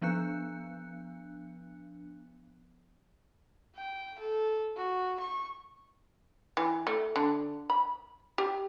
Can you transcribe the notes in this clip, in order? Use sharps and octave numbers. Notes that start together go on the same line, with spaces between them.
F3 B3 D4 F#6 C#7
G5
A4
F#4
C#6
E3
A3
D3
B5
G4